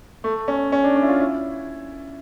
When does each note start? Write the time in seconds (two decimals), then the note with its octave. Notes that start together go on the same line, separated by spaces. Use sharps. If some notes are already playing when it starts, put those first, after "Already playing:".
0.24 A3
0.48 C#4
0.72 C#4
0.84 D4
0.96 D4
1.02 E4
1.08 F4
1.20 E4